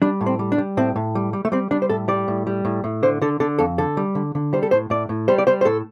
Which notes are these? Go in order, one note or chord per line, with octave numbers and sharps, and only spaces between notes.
G3 D4
A2
C4
G3
D4
G3
A2 C4
A2
G3
G3
A3
G3 C4
G3 D4
C5
A2 A4
G3 D5
A2
G3
A2
A2
D3 C5
D3 A4
D3 A4
F2 A4
D3 A4
G3
D3
D3
G3 C5
A4
A2 C5
A2 D5
A2
G3 C5
D5
G3 C5
C5
A2 A4